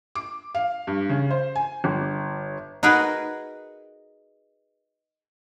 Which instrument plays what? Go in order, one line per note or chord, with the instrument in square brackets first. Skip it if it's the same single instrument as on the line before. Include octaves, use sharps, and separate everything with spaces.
[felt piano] D6
F5
G2
C#3
C5
G#5
G1
[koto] D#4 F#4 G#4 A#4 B4